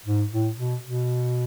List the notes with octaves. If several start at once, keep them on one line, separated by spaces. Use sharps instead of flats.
G#2
A2
B2
B2